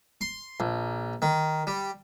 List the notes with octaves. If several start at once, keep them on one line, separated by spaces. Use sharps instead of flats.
C6
A#1
D#3
G3